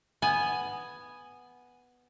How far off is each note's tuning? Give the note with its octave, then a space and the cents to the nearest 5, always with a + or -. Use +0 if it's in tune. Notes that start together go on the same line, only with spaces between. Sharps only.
B3 +0 G#5 +0